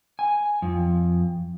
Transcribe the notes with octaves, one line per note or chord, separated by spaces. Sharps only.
G#5
F2